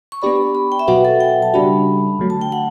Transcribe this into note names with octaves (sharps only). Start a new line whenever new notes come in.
C#6
B3 D4 G4 D5 B5
B5
G5
E5
B2 F#3 B3 F#4 B4 F#5
A4
G5
A5
C#3 G3 D4 F#4 B5
D3 F#3 A3
A5
G5
F#5